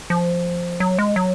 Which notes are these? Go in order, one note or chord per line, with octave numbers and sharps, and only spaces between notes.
F3
F#3
G#3
F#3